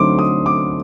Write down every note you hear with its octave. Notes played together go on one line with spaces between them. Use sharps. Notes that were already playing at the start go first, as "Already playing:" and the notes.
Already playing: D3 F#3 A3 C4 D#4 C6 D6
D#6
D6